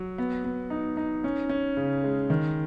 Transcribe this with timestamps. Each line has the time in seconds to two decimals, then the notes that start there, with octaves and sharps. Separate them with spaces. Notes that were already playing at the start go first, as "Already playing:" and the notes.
Already playing: F#3
0.18 B3
0.44 B3
0.70 D#4
0.97 D#4
1.24 C#4
1.49 C#4
1.77 C#3
2.03 G#3
2.30 D#3